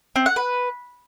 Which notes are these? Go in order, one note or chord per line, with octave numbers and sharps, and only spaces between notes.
C4
F#5
B4